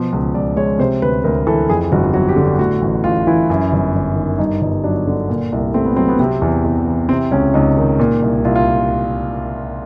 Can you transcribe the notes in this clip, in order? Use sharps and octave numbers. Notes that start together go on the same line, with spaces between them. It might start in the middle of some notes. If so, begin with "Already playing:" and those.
Already playing: B2 F3
C#2
C#2 D5
G#3 C#5
C3 C5
D2 B4
D2 A#4
E3 A4
F2 G#4
G1 F#4
F#3 F#4
G4
D3
F#4
A2 F#4
A1
A1 F4
E3 E4
F#2
G1
G1
D#3
G2 D#4
G1
F#3 D4
D3
A#2
C2
A3 C4
B3
F#3 C4
B3
C3 C4
E2
E2
E3
C3 C4
C#2 C#4
C#2 D#4
D#3
A#2
C2
C2 F4
F4